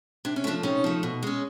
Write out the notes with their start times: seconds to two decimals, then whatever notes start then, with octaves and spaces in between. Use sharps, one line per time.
0.25 C3 D4
0.36 C#4
0.44 F3 A3 D4
0.63 C3 C#4 D#4
0.84 F3 A3
1.03 B2
1.23 G#3 C#4